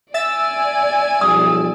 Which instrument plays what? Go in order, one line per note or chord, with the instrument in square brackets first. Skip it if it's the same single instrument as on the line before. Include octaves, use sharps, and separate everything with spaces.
[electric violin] D5 G#5 [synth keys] E5 E6 A6
[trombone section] B1 F3 G3 [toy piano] D#6